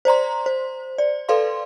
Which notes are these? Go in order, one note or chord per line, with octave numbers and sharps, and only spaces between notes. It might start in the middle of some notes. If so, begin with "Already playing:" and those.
C5 D5 A#5 C6
C5
D5
A4 B4 D5 F5 C6